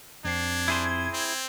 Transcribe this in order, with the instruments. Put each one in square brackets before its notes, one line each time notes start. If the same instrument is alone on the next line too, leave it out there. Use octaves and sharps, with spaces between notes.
[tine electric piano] F2 C4 C7 [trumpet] D4 [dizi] G#6
[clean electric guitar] E4 G#4 C5
[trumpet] C4